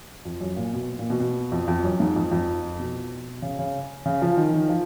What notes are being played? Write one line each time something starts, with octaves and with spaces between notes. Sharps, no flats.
F2
F#2
A#2
B2
A#2
B2
B2
F2
F2
F#2
G#2
F2
F2
B2
C#3
C#3
C#3
F3
D#3
D#3
F3